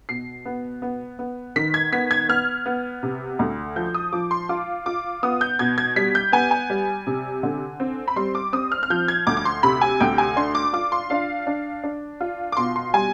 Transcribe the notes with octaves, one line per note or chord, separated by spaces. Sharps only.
B2 C7
B3
B3
B3
D#3 B6
G#6
B3 B6
G#6
B3 F6
B3
C3
D2
F3 G6
D#6
F3 D6
C6
F4 D6
F4 D6
B3 D#6
G6
B2 G#6
G#6
G3 B6
G6
B3 G#5
G#5
G3
C3
D3
C4
B5
G3 C6
D6
C4 D#6
F6
F6
F3 G6
G#6
D2 D6
D6
C6
C3 B5
G#5
D2 G5
G#5
D4 C6
D6
F4 D6
C6
D4 F5
D4
D4
F4
D6
B2 C6
C6
G3 G#5